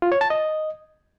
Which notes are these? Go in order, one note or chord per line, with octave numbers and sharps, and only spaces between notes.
F4
C#5
A5
D#5